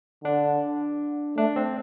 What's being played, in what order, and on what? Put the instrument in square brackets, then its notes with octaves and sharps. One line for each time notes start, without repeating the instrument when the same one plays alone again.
[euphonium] D3 [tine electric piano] D4
[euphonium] A3 [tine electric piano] D4
[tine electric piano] C4